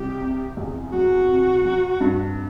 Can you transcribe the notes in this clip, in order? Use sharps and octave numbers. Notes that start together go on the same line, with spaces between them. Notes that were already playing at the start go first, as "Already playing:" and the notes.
Already playing: C2 G4
C3
E2
F#3 F#4
C3
F#3
G2